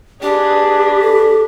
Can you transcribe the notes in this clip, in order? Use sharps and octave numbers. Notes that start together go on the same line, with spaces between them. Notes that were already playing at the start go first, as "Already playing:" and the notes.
D4 G4 G#4 B4
A4